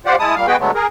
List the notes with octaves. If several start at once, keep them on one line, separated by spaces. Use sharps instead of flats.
F4 G4 C5 D5 F#5
G#3 E4 A5 D#6
A#2 G3 F5
G#3 B3 F#4 G#4 B4 G5
D3 F#3 G#3 A3 B3
G#4 A#4